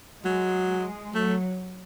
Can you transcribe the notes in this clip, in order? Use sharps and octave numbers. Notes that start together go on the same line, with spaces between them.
F#3 G#3
F#3 A3